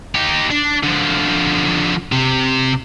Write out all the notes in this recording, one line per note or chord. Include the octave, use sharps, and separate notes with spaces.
D#4 G4
D4
D3 F3
C3